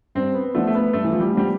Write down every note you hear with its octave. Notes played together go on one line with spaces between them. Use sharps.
G2 C4
B3
F3 A3 B3 D4 F4
A3
B3
G2 A3
E3
F3
G3
F3 G3 B3 D4 F4